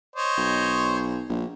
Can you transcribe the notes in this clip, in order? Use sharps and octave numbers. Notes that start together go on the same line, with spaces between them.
C5 C#5 D#5
B1
A#1